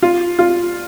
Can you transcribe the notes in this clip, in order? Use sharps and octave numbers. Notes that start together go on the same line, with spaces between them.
F4
F4